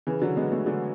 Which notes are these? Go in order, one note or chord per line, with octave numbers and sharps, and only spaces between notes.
C#3 E3
D3 F#3
G#3 B3
F#3 A3
D3 F#3